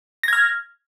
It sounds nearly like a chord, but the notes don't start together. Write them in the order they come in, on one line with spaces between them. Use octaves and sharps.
A#6 G#6 F6